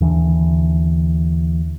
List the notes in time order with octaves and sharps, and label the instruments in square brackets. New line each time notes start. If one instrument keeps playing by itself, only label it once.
[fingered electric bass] D#2 D3 E3 D4